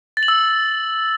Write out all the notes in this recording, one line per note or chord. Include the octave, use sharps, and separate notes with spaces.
A6
F#7
E6